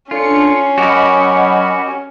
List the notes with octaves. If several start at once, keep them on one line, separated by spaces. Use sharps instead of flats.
C#4 D4 F4 A4 C#7
F#3 F#4 G4 A#4 D#5 F#5 B5 C#6